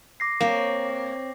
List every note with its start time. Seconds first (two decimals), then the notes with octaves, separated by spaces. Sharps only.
0.20 D6 A#6 C7
0.41 A#3 C4 C#5